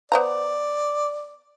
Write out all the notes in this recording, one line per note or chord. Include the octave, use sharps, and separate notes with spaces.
B3 C5 D5 A#5